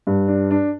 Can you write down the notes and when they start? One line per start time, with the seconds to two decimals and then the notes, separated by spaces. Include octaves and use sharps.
0.07 G2
0.28 D4
0.51 D4